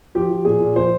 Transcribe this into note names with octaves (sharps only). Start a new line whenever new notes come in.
F3 G4
F3
A#2 G#4
A#2
F3 C5